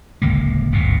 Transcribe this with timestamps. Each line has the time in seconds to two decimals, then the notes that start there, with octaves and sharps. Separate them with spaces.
0.22 D1 G1 C#2 A#3
0.72 D1 A1 G#2 B2